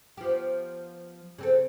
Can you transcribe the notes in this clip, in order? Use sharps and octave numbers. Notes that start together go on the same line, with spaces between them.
F3 B3 G4
C#3 C4 A4